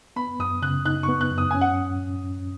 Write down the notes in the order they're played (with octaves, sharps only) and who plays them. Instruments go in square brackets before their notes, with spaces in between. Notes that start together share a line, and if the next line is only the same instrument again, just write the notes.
[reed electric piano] B3 [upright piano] B5
[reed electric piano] F#2 [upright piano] D#6
[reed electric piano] C#3 [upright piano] F#6
[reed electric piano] D#4 [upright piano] F#6
[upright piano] C#6
[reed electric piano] B3
[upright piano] F#6
[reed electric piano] F#2
[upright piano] D#6
[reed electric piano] C#4 [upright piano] G#5
[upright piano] F#5